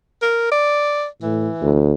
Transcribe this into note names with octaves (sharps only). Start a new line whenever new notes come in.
A#4
D5
A2 E3
D2